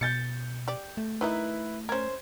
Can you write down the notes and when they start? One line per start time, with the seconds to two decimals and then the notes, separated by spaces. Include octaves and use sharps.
0.01 B2 G6 A6 C#7
0.68 G4 D5
0.97 A3
1.21 D#3 E3 D#4 E4 B4
1.89 C#4 A#4 C5 G#6